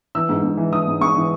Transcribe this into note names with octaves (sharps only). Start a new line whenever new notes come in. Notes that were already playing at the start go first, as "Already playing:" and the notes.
E3 E6
G#2
G#2
E3
E3 D#6
G#2
G#2 C#6
E3